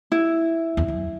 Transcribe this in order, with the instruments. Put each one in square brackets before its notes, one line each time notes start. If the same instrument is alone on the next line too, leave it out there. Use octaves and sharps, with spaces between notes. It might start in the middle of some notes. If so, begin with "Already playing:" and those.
[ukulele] E4
[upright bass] E2
F#2